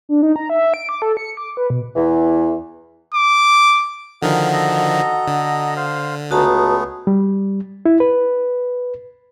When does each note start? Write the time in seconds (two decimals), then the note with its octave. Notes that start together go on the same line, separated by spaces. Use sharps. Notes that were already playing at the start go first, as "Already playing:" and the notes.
0.09 D4
0.23 D#4
0.36 A#5
0.50 E5
0.74 D7
0.89 D6
1.02 A4
1.17 C#7
1.37 D6
1.57 B4
1.70 B2
1.96 E2 E3
3.14 D6
4.22 D3 D#3 F3 F#4 G#4 A#4
4.53 A4 D#5 A#5
5.28 D3
5.76 C5 F5
6.31 C#2 A3 B3 F#4 G#4 A5 A#5
7.07 G3
7.86 E4
8.00 B4